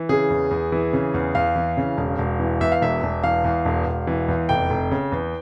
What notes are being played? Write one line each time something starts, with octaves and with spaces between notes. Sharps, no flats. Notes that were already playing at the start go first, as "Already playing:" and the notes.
Already playing: E3
C#3 G#4
E2
E2
E3
C#3
E2
E2 F5
E3
C#3
E1
E1
E3
E2 E5
F5
E1 E5
E1
E3 F5
E2
E1
E1
E3
E2
F1 G5
F1
C#3
E2